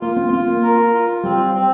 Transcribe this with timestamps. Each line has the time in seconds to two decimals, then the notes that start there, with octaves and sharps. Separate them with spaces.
0.01 A#3 F4
0.16 C4
0.28 A#3
0.32 C4 F4
0.48 A#3
0.63 A#4
0.94 F4
1.23 G3 C4
1.55 C4